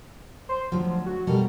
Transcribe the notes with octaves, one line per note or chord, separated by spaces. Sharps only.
C5
D2 F3 F#3
F#4
B2 G3 A4 A#4